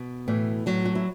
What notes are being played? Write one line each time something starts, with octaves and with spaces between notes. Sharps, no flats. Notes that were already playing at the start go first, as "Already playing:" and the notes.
Already playing: B2
A2 E3
A2 F#3
F#4
E4